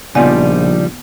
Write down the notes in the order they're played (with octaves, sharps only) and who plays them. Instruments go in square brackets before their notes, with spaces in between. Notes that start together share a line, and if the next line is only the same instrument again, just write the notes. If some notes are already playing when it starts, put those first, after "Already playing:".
[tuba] A#1 [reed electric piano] C#3 D5 [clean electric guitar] F3 G3 D#4 [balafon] B3 G#5